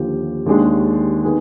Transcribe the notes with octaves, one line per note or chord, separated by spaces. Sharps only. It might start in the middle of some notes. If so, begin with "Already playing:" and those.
Already playing: D#2 D3 F3 G4
D#2 D#3 G#3 D4
D#3 B3 G#4